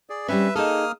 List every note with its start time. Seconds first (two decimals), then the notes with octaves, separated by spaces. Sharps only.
0.10 G#4 D5
0.28 G3 C4 C#4 B4 E5
0.55 A#3 D#4 G#4 A4 D#6 F6